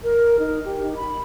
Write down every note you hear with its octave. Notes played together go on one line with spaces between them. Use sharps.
A#4
D#4
G4
D#4
B5